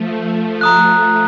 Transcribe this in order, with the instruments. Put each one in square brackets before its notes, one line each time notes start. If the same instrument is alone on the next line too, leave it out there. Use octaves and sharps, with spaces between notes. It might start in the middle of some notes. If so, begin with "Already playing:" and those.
Already playing: [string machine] F3 A3
[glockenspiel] A#5 D#6 F#6